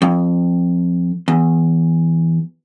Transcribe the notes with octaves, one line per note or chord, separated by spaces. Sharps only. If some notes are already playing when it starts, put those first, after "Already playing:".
F2
E2